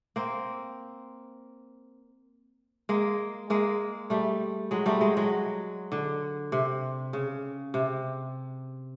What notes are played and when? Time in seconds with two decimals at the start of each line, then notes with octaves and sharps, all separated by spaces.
0.16 A#3 C4
2.89 G#3 A#3
3.50 G#3 A#3
4.10 G3 A3
4.71 F#3 G#3
4.86 G3 A3
5.01 F#3 G#3
5.17 F#3 G#3
5.92 D3
6.52 C3
7.13 C#3
7.74 C3